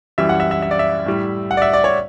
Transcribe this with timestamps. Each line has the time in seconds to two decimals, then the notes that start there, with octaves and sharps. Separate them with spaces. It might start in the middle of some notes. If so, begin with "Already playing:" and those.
0.18 F#2 E3 G3 E5
0.29 F#5
0.40 E5
0.51 E5
0.62 E5
0.71 D5
0.79 E5
1.06 A2 G3
1.51 F#5
1.57 D5
1.62 E5
1.73 D5
1.84 C#5